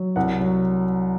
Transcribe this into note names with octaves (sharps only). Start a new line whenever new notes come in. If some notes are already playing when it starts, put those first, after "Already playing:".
Already playing: F#3
C2 F#5
F#3